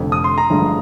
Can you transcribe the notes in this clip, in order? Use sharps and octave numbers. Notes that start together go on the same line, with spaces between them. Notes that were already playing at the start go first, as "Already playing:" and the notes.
Already playing: F1 F2 D3
D#6
C6
A#5
A1 G2 D3 F3 G#3